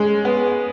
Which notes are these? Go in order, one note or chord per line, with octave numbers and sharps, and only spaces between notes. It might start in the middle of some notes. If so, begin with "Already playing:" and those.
Already playing: G#3 C#4
B3